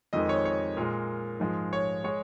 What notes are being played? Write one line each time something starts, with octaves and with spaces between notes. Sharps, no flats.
F2 D#3 G#3 D#5
C#5
C#5
A#2 G#3 A#4
G#2 F3 G#3
C#5
G#3 C#5